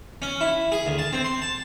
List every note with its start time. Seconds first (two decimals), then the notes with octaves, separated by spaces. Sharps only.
0.22 C#4
0.41 E4
0.72 G#4
0.86 D2
0.99 A5
1.13 C4
1.24 C6
1.42 A5